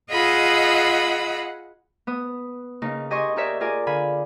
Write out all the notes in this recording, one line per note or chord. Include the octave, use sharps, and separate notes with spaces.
F4 G#4 D#5 F#5 B5 E6
B3 D#6
C#3 A#3 D#4
G4 D#5 G#5 C6 C#6 D#6
D#4 G4 A#4 C#5 D5 E5
F4 G#4 A#4 D5 G#5
D3 F5 G#5 B5